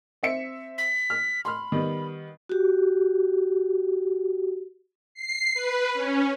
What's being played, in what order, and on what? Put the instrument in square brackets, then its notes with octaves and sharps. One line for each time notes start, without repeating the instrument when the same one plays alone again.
[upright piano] C4 E5 C#7
[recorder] B6
[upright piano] F6
[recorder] B5 [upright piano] C6 F6
[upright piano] D#3 G3 B3
[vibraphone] F#4 G4
[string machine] C7
B4
C#4